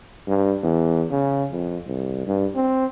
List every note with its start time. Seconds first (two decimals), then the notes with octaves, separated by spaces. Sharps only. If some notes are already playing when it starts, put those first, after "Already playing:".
0.27 G2
0.63 E2
1.10 C#3
1.51 F2
1.86 C2
2.27 G2
2.55 C4